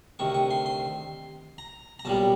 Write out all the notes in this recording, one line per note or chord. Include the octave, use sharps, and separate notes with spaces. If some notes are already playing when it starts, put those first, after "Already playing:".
D2 C3 D#3 C#6
C#6
C6
C6
A#5
A#5
B1 A#2 G3 A5